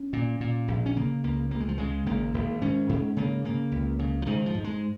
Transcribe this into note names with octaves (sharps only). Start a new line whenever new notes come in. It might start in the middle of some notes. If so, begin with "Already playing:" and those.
Already playing: C#4
A#2
A#2
A#1
C#4
C#3 A#3
C#2 A#3
C#2 A#3
G#3
F3
C#3 G#3
G#1 A#3
G#1
G#2 C#4
G#2
C#3 A#3
C#3 A#3
C#2
C#3
F3
G#2 D#3
F3
G#2
G#3